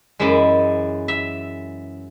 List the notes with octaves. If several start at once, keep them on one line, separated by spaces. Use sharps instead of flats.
F#2 E3 G#3 E5
E5